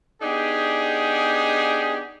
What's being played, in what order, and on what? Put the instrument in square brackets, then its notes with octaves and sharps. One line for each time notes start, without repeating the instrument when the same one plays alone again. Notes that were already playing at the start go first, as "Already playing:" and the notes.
[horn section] B3 D4 D#4 G4 G#4